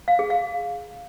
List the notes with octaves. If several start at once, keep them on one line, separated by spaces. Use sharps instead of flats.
F5
G#4
F5